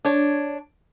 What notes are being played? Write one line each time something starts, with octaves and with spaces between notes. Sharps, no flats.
D4 C#5